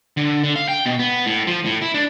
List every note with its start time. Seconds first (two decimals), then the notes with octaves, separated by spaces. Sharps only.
0.17 D3
0.44 D3
0.56 F5
0.68 G5
0.86 B2
0.99 B3
1.26 A2
1.47 F3
1.65 A2
1.82 E4
1.94 D4